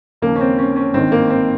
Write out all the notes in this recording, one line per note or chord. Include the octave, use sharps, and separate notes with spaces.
D#2 C#3 F3 A#3
C#4
C4
C#4
C#4
G#1 G2 D#3 C4
A#3
C4